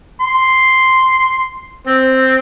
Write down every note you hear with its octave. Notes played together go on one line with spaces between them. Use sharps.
C6
C4